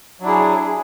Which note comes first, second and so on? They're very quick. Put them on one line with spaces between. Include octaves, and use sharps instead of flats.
F#3 D4 E4 G#4